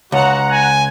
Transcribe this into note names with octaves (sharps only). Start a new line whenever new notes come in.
C#2 F#4 F#5 A#5 F#6
G#5